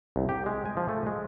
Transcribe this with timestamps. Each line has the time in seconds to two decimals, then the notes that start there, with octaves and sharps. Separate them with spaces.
0.16 C2
0.29 G4
0.46 G#3
0.65 G#5
0.77 F3
0.89 A3
1.06 G#3